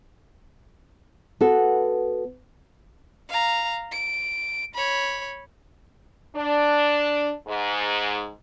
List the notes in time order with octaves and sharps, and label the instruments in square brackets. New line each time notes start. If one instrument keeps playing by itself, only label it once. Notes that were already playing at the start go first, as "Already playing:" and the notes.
[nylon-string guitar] B3 F#4 A4
[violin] F5 A#5
D7
C#5 B5
[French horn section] D4
G#2